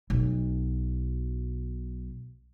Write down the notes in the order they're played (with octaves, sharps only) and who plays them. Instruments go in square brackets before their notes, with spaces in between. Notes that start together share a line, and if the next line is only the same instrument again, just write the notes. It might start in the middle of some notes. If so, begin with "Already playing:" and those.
[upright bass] B1 B2